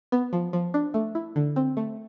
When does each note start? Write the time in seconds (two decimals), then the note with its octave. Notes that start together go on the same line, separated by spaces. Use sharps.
0.12 B3
0.33 F3
0.53 F3
0.74 D4
0.94 A3
1.15 E4
1.36 D3
1.56 C4
1.77 A3